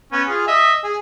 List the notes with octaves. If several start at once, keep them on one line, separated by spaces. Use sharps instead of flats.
B3 C#4
F4 G#4
D#5 E5
G#4